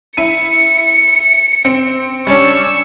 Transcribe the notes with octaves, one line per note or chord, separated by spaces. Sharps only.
E4 C#7 D#7
C4
G3 C#4 D4 C#6 E6